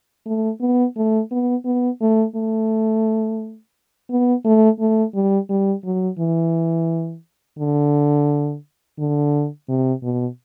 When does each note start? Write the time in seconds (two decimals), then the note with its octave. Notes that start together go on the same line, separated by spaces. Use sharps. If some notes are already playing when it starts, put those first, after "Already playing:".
0.26 A3
0.61 B3
0.97 A3
1.31 B3
1.65 B3
2.01 A3
2.36 A3
4.10 B3
4.45 A3
4.80 A3
5.14 G3
5.50 G3
5.85 F#3
6.19 E3
7.58 D3
8.99 D3
9.69 C3
10.03 B2